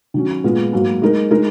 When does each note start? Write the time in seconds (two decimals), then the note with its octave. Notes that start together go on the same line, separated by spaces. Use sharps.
0.14 D#3 F#3 C#4
0.44 A#2 G#3 B3 F4
0.73 G#2 F#3 A#3
1.02 G#3 D#4 A#4
1.31 G#3 D#4 A#4